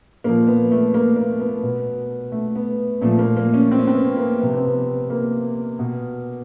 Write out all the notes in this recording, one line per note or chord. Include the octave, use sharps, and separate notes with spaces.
A#2 F3 A#3
B3
A3
A#3
A#3
B3
B2
A3
B3
A#2 F3 A3
A#3
A#3
C#4
C4
C#4
C4
B3
A#3
C3 F3 B3
C4
B3
A#3
B2